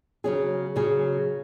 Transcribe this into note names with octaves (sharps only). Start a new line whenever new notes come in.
C#3 F#3 C#4 G#4
C#3 F#3 C#4 G#4